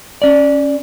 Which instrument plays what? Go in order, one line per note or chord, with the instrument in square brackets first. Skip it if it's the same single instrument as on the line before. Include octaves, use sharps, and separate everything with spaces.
[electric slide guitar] C#4 D5